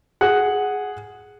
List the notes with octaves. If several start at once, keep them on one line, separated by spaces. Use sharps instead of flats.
G#4 F#5